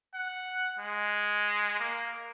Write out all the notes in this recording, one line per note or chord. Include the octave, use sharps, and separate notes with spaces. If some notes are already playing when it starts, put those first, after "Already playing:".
F#5
G#3
A#3